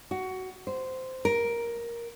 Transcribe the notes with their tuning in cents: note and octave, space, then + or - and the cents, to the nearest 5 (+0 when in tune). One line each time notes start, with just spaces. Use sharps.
F#4 +15
C5 -10
A#4 +10